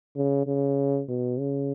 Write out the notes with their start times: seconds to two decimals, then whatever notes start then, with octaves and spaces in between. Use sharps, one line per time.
0.16 C#3
0.47 C#3
1.08 B2
1.39 C#3